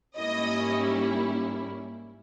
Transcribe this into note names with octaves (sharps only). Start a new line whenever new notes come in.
G#2 G3 A#3 C#4 E4 D#5